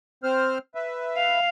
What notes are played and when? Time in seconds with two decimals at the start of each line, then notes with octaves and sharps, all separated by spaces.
0.23 C4 C5 F6
0.75 B4 E5
1.17 F5